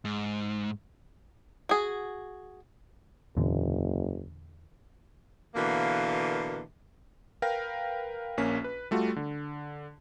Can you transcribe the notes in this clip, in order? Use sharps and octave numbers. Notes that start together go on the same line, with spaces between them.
G#2
F#4 G#4
F#1 E2 A#2 D3
B2 D3 E3 A#3
A#4 B4 F5 G5 A#6
A#1 A#3 C#4 B6
B4
G3 A3 F4 F#4
D3